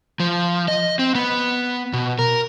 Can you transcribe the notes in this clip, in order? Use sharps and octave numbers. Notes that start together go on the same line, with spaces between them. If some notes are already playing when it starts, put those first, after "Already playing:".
F3
D#5
C4
B3
B2
A#4